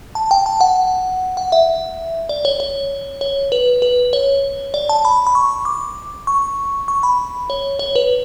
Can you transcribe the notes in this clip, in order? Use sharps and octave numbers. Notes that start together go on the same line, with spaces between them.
A5
G5
A5
F#5
F#5
E5
D5
C#5
C#5
C#5
B4
B4
C#5
D5
A5
B5
B5
C#6
D6
C#6
C#6
B5
C#5
C#5
B4